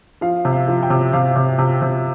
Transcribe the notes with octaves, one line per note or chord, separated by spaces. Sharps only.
F3 F5
C3
F5
F3
G5
C3
C3 F5
C3
C3
C3